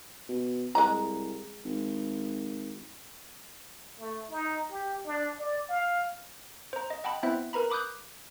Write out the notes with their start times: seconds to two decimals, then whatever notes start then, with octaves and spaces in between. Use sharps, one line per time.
0.29 B2
0.75 C2 G#3 D#5 A#5
1.65 G#1
3.99 A3
4.30 D#4
4.71 G4
5.06 D4
5.40 D5
5.69 F5
6.73 C5 A#5
6.90 D#5
7.04 D#5 F#5 G5 A5 B5
7.23 B3 C4 E4 C5 E5 F#6
7.53 A#4 B4 A#5 B5
7.70 B5 D6 D#6 F#6 G6